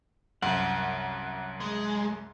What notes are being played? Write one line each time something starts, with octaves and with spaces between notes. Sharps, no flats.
C2 F#2 F#5
G#3